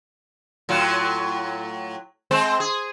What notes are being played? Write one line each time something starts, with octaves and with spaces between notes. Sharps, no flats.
A2 F#3 F4
G#3 C4 C5
G#4